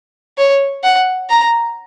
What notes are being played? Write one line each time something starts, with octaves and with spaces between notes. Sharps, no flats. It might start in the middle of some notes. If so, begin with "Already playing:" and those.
C#5
F#5
A#5